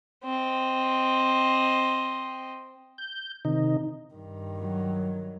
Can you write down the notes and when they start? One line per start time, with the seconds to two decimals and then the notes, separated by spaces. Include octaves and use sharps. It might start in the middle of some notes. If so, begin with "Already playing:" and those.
0.24 C4 D#5
2.98 G6
3.45 C3 D#3 D#4
4.13 G2 D#3
4.60 F#3